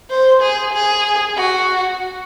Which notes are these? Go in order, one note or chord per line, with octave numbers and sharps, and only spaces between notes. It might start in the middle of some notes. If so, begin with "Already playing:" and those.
C5
G#4
G#4
F#4